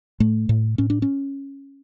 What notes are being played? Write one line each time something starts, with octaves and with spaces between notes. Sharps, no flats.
A2 A3
A2
A2 C#4
D4
C#4